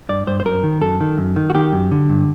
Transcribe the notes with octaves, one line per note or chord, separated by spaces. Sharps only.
G2 D5
G2 C5
C5
F#2 A#4
D#3
F#2 A4
D#3
F#2
D#3
F#4
D#3 G4
F#2
D3
G2